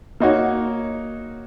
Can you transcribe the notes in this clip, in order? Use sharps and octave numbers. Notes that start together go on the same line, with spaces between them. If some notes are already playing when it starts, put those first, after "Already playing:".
A#3 D#4 F#4 C#5